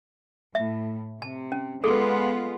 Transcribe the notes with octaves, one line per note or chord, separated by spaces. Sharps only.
A2 E5
C3 A5
C#4
G#3 B3 F4 G#4 A4